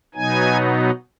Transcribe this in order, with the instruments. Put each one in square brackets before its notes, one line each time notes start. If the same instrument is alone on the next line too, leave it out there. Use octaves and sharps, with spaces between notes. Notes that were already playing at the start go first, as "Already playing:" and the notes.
[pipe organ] B2 F#3 B3 D#4 G#5